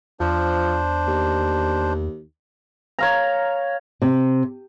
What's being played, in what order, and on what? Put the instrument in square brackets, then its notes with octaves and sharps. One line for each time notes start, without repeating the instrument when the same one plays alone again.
[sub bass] E2 [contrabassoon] F3 [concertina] D4 C5
[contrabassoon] D#2
[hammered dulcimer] C#5 F5 A#5
[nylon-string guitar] C3